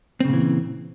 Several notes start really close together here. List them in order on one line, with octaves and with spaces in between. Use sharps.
C4 C#3 A#2 E3